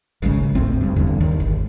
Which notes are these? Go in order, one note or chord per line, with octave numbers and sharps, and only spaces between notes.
G#1 C#2 C#3 G#3
G#1 D2 A2 C4
D2 G2
G1 E2 G2 D3
F1 D#2 D#3
G#1